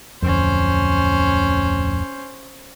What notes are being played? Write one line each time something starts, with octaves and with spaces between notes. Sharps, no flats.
D1 F2 C#4 C5